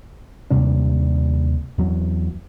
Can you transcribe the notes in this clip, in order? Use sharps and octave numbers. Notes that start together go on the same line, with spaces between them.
D#2 C3 G3 D4
E2 F#3